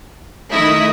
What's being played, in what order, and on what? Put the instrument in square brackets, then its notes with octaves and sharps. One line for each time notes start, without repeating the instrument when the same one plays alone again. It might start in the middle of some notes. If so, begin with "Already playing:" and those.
[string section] D#3 A3 E4 [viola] D#5